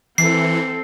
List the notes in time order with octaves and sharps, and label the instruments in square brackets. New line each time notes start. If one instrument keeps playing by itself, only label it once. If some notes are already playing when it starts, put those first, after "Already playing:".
[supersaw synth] E3 [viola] C4 A4 [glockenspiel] C7